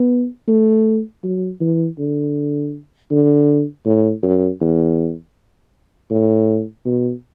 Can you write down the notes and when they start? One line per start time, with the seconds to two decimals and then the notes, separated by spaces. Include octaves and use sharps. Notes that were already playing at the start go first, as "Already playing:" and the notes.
Already playing: B3
0.48 A3
1.24 F#3
1.61 E3
1.98 D3
3.11 D3
3.86 A2
4.23 F#2
4.61 E2
6.11 A2
6.85 B2